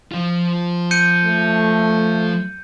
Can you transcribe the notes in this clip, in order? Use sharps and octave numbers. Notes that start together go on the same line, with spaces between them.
F3 F4
G6 C#7 D#7
A3